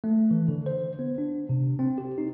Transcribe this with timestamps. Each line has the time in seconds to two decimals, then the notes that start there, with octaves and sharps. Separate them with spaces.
0.04 A3
0.31 E3
0.48 D3
0.66 C5
0.99 B3
1.18 D4
1.49 C3
1.79 C4
1.98 G4
2.18 D#4